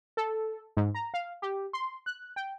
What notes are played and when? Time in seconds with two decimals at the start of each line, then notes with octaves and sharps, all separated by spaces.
0.17 A4
0.77 G#2
0.95 A#5
1.14 F5
1.42 G4
1.73 C6
2.06 F#6
2.36 G5